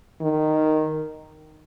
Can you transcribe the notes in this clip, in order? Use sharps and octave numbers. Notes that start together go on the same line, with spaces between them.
D#3